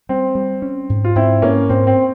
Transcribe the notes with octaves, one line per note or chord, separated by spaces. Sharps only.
G3 C4
G3
C#4
G#2
F4
G#2 C4 E4
G#2 A#3 C#4
G#2 C4
C4